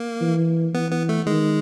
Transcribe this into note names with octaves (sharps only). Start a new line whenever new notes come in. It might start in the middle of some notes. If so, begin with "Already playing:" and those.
Already playing: A#3
E3
E3 B3
B3
A3
D#3 G#3